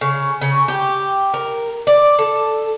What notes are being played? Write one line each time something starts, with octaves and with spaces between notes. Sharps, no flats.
C#3
C#3
G4
A#4
D5
A4